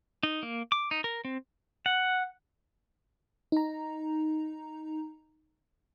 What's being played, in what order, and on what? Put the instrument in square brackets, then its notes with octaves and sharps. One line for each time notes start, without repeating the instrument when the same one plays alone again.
[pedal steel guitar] D#4
A#3
D6
D#4
A#4
C4
F#5
[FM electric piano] D#4 A#5